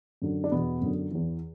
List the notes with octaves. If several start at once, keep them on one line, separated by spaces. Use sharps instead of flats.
F#2 D3
D4
E2 B2 B3
F#2 D3
E2 E3